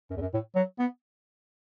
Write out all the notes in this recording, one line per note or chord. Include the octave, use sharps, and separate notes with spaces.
F#2
E2
F#2
A2
F#3
B3